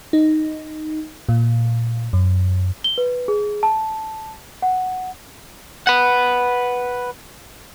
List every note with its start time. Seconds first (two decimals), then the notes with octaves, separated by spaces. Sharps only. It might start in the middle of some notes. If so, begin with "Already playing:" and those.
0.13 D#4
1.29 A#2
2.13 F#2
2.84 G7
2.98 B4
3.28 G#4
3.63 A5
4.62 F#5
5.87 B4 F#5